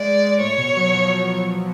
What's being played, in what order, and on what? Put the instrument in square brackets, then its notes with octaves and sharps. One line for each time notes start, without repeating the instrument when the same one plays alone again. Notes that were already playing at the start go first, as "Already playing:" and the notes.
Already playing: [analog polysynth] G#3 [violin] D5
[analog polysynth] A2 [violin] C#5
[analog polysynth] B2
F#3
F3